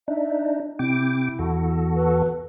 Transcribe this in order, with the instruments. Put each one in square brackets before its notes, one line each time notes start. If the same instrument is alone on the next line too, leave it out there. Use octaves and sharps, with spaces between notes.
[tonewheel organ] D4 D#4 [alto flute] E5
[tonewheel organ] C3 G5 D6 [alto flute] E4
[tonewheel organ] E2 F#4 A4
[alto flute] B4